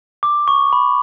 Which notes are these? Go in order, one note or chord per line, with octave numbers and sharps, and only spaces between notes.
D6
C#6
B5